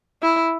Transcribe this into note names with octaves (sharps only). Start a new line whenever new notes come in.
E4